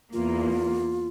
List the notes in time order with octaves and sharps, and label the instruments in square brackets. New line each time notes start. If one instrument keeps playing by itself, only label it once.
[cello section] E2 A#3 [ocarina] F4